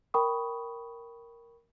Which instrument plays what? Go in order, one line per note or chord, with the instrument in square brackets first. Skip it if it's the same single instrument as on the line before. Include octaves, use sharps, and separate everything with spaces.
[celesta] A#4 G5 B5 C#6 D#6